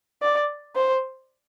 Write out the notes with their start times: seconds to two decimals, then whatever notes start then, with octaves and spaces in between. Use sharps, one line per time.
0.22 D5
0.76 C5